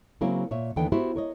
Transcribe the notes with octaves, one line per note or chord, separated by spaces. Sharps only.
C#3 F#3 A#3 C4 C#4 E4
A#2 C#5 E5
D#2 D3 E3 B3 A4 G5
B3 E4 F#4 G4 C5
A#4 C#5 D#5